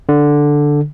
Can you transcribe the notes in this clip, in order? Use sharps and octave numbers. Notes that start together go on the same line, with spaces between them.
D3